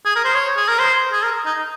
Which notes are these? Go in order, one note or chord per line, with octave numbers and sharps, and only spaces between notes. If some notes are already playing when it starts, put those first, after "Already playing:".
G#4
A#4
C5
C#5
G#4
A#4
C5
G#4
A#4
D#4